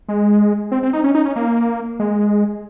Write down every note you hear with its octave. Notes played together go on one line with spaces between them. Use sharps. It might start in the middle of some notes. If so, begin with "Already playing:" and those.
G#3
C4
C4
D#4
C#4
D#4
C#4
A#3
G#3